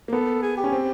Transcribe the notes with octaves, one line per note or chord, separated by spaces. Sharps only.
A#3
B3 A4
G#4
G4
C#4
C4